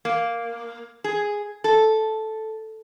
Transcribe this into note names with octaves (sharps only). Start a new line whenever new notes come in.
A#3
G#4
A4